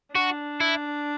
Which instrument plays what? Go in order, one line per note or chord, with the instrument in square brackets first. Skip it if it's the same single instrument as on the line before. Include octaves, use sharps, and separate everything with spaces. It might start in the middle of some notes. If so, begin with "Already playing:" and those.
[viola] D4 [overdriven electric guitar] F#4
[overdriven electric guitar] E4